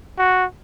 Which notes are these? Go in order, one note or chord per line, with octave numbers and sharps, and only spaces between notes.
F#4